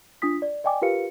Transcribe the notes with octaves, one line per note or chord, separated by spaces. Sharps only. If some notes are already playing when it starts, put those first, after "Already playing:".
D4 F4 D#6 B6
D5
D5 D#5 G5 G#5 D6
F4 G4 A#4 B4 F5 C#7